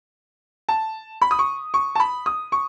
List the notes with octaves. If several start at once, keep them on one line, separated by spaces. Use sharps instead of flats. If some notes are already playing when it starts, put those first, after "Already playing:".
A5
B5
D#6
C#6
C#6
A5
B5
D#6
C#6